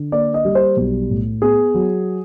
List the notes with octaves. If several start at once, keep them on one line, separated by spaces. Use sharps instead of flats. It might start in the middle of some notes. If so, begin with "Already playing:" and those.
Already playing: D3
A#3 D5
D#5
G3
C5
B1
A2
B3 G#4
F#3